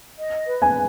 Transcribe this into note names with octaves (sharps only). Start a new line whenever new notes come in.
D#5
B4
G#5